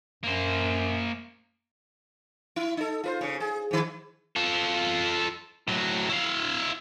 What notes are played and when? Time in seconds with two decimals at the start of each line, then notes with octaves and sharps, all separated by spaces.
0.24 F#2 A#3 C5
2.56 E4
2.77 D#4 A4
3.04 F4 B4 C5
3.21 C#3 C#4
3.40 G#4
3.71 G#2 D#3
4.36 F4 A4
5.68 A2 F#3
6.10 E4 F5